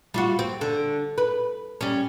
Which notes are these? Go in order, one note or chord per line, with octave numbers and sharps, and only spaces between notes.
G3 F4 F#4
C4
D3
B4
G3 C#4